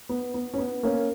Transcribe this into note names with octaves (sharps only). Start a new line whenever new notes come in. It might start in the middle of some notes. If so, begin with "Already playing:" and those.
B3
B3
C#4
B3
A#3 C#4